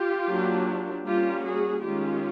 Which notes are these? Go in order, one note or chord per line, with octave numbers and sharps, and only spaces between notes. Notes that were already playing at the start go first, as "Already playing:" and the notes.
Already playing: F4 G4
F#3 A#3 D4
G3 A#3 C#4 F4 G4
F#4 G#4
D#3 G#3 C#4 F4 G4